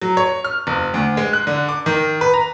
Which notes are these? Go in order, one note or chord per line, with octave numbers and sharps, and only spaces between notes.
F#3
C#5
F6
F#1
D2
G#3
F#6
D3
D6
D#3
B4
A#5